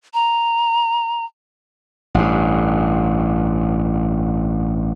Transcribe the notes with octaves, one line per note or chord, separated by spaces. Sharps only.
A#5
A1 G2